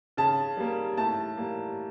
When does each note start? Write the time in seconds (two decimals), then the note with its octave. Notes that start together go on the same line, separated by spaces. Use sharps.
0.17 C#3 A5
0.57 G3 A#3
0.97 A2 A5
1.37 G3 A#3